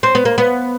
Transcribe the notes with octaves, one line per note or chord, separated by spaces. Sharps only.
C4
B3
A#3
B3